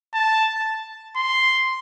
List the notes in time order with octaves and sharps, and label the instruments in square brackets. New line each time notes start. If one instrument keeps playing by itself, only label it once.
[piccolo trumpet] A5
C6